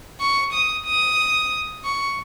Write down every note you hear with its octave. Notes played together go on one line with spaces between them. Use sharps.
C#6
D#6
D#6
C#6